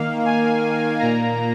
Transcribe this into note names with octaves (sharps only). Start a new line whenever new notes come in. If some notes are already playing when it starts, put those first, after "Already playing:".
Already playing: D#3 A#3 F5
G#5
A#2 A#3 A#5